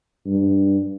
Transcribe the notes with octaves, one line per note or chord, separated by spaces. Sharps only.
G2